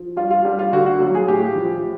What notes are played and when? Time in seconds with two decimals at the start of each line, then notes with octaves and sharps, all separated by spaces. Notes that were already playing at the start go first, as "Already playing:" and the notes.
Already playing: F3
0.17 G3 F4
0.31 F4
0.45 G3
0.59 F4
0.72 D3 F#4
0.86 F#4
1.00 F#3
1.15 G#4
1.28 A2 G4
1.56 F3